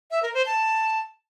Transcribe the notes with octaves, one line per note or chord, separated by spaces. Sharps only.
E5
A#4
C5
A5